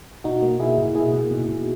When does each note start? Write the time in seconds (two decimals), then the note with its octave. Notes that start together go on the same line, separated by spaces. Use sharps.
0.24 B2 D#4 F#4
0.42 A#3
0.60 B2 E4 G#4
0.78 B2
0.95 A#3 E4 G#4
1.14 B2
1.31 B2
1.49 B2